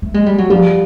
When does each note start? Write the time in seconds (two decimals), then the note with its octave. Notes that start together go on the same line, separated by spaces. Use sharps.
0.02 A3
0.14 G#3
0.26 G3
0.38 F#3
0.50 F3 G3